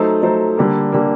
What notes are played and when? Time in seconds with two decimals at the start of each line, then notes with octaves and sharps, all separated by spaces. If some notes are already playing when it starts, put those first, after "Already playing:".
Already playing: F#3 A3 D#4 A4 C5
0.23 F#3 A3 D#4 A4 C5
0.57 D3 G3 A#3
0.92 D3 G3 A#3